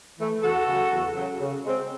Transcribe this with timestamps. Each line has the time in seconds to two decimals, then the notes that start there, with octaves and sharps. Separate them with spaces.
0.18 E3 A3
0.42 E2 F#4 A4
0.67 C#3 F#3
0.91 E2
1.15 C#3 F#3
1.40 C#3
1.64 G#3 C4